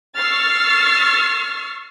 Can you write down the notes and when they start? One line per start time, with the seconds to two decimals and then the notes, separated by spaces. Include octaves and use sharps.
0.18 C#6 E6 F6 A6 C7